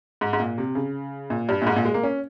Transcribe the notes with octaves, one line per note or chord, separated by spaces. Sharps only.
G#2
G#2
A#2
C3
C#3
A#2
G2
A#2
G#2
A#2
G#3
A#3
C#4